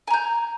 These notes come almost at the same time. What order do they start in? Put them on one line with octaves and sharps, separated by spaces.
G#5 A#5 G6